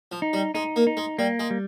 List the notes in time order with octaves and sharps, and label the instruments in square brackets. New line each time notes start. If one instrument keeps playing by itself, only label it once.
[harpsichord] F3
[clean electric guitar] D#4
[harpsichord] G3
[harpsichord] G#3 [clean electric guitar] D#4
[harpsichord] A#3
[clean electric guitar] D#4
[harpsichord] G#3
[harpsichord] G3 [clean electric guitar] A#3
[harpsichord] G#3
[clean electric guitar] G3